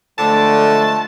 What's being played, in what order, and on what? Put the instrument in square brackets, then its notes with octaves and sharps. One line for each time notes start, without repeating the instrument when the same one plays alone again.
[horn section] D3 [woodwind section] F3 G#3 A3 [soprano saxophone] A5